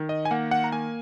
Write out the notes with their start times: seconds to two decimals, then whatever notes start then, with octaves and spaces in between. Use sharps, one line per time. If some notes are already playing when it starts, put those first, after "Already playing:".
Already playing: D#3
0.09 D#5
0.25 G#5
0.31 A#3 F#5
0.51 F#5
0.64 A#5
0.72 A#3 G#5